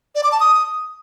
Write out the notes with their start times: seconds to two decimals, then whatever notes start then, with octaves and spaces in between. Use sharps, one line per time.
0.15 D5
0.24 D6
0.32 A5
0.40 D#6